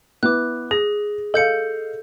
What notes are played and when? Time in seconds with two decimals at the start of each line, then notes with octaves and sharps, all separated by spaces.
0.23 B3 E4 B4 D6 F#6
0.71 G#4 A#6
1.34 A4 D#5 F5 G6 C#7